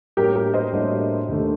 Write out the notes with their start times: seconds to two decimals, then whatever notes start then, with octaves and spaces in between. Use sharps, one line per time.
0.17 A2 G3 A#3 D4 F#4 G4 A#4
0.36 G4 A#4
0.54 C5 D#5
0.73 A2 G3 A#3 D4 F#4
1.28 D#2 D3 A3 D4